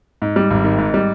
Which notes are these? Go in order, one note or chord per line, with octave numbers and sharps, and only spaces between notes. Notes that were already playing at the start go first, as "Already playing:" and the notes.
G#2
G3
G#1
D#3
G#2
G3